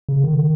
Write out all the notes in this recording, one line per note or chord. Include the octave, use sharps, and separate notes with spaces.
C#3
D#3